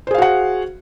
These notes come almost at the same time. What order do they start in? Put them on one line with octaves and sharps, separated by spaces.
C5 G#4 F5 F#4 F#5